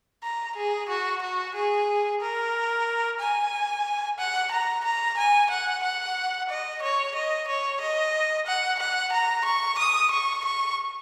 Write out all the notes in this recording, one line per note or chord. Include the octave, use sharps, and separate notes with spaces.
A#5
G#4
F#4
F#4
G#4
A#4
G#5
F#5
A#5
A#5
G#5
F#5
F#5
D#5
C#5
D#5
C#5
D#5
F#5
F#5
A#5
C#6
D#6
C#6
C#6